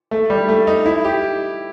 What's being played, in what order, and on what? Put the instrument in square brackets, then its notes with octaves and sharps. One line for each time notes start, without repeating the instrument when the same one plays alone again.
[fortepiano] A3
G3
A3
D#4
E4
G4